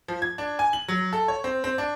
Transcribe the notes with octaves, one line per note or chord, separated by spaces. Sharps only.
F3
G#6
D4
G#5
F#7
F#3
A4
C#5
C4
C4
D4